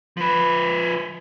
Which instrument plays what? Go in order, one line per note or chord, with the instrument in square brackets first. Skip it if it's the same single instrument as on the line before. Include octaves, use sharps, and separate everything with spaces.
[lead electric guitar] F3 B4